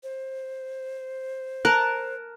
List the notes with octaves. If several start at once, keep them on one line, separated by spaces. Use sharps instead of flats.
C5
A#4 A5 F#6